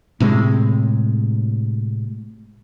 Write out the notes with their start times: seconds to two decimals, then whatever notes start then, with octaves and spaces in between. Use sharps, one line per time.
0.20 A2 C3 G#3